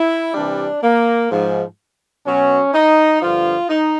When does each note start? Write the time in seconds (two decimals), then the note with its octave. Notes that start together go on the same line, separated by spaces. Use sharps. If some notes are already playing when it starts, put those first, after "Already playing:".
Already playing: E4
0.33 C3 E3 G3 D4
0.82 A#3
1.30 G#2 F3
2.25 B2 F#3 C#4
2.74 D#4
3.21 G2 D3 F3 F4
3.68 D#4